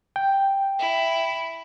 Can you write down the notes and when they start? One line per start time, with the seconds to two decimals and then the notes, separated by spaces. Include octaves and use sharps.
0.16 G5
0.79 E4